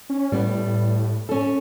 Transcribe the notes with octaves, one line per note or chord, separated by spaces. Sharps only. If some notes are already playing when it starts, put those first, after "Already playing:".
C#4
A2 G3 B3
C#4 A4